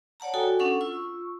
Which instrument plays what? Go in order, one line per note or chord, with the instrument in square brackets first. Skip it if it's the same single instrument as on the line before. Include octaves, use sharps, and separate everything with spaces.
[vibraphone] C#5 D5 F#5 A5 A#5
F#4 A4 G5 G#5 D#6
C#4 D4 A4 F#5 C#6
F4 C#6 E6